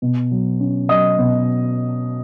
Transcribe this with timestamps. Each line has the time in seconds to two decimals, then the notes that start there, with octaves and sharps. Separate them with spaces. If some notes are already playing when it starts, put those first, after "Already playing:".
0.02 B2
0.31 F#3
0.60 C#4
0.89 F#3 D#5 D#6
1.18 B2